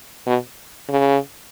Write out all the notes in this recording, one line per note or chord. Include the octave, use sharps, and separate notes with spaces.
B2
C#3